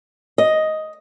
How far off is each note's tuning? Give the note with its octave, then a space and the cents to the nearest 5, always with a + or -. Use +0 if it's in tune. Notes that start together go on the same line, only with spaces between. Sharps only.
D#5 +5